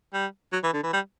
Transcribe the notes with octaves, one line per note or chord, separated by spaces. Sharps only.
G3
F#3
E3
D3
E3
G3